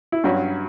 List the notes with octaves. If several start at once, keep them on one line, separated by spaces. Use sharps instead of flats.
E4
G2 F#3 C#4 F#4